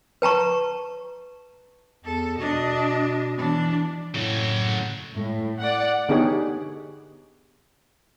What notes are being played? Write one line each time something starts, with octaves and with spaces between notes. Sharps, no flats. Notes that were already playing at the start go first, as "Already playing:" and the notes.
B4 A5 A#5 C#6
E2 A4
B2 D4 D#5
E3 B3 D4
A2 C#3 F#3
A2
D5 F#5
D3 B3 D#4 G4 G#4 C#5